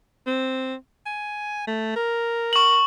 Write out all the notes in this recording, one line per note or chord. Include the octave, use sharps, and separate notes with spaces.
C4
G#5
A3
A#4
C#6 F#7